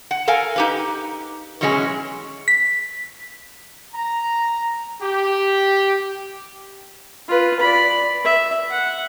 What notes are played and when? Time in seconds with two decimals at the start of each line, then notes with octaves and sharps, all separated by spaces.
0.11 F#5
0.28 A4 A#4 F5 G#5
0.56 D#4 G4 B4
1.61 B2 E3 F#3 G#3 C4 C#4
2.48 B6
3.93 A#5
5.02 G4
7.28 F4 B4
7.60 D5 B5
8.25 E5
8.71 F#5